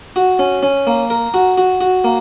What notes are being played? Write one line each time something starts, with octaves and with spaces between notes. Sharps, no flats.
F#4
C#4
C#4
A#3
A#4
F#4
F#4
F#4
A#3